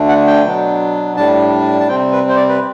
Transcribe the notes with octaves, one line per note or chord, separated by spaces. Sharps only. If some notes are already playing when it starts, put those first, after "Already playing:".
Already playing: D2 D3 A3 D4
F#5
G5
B2 F#3 B3 D4
A2 G3 D4 A5
A5
C3 G3 C4 G5
B4
C5
D5
B4